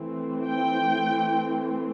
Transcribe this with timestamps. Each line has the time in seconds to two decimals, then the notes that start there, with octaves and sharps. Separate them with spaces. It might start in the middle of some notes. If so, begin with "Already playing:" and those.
Already playing: E3 A3 C4
0.47 G5